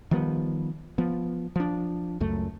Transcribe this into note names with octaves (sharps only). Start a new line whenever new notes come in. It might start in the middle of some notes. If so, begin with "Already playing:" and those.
D#3 F3 G3 B3
F3 B3
F3 D4
C#2 F#2 A3